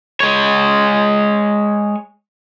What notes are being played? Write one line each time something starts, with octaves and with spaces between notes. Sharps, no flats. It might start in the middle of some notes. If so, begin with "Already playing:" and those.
G#3 C#5